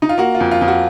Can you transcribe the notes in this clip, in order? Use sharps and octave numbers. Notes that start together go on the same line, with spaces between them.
D#4
F4
A#3 F#4
F4
F2
F4
F2
F#4